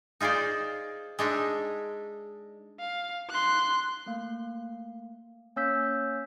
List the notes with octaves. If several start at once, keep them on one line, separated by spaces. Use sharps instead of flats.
D#4 F4 G#4 C5 D5
G#3 D4 D#4 E5
F5
C6 F#6
A3 A#3
A#3 C#4 C#5 E6 G6 B6